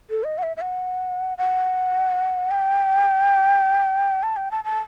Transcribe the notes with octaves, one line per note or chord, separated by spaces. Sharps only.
A4
D#5
F#5
E5
E5
F#5
F#5
G5
A5
G5
A5
A5